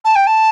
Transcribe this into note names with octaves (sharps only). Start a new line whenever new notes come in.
A5
G5
A5